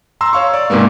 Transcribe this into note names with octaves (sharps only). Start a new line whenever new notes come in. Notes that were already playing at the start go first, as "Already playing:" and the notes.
A#5 C6 E6
C#5 F5 C#6
D5
G#2 C3 G#3 A#3 B3